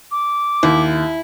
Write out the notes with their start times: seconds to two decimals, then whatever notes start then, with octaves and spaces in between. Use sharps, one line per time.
0.11 D6
0.63 D#2 E4